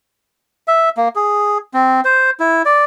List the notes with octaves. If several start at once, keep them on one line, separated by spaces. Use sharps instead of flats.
E5
A#3
G#4
C4
C5
E4
D5